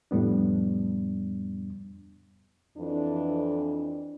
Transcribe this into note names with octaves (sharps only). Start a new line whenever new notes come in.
F2 A2 G3 B3 D4
F2 E3 D4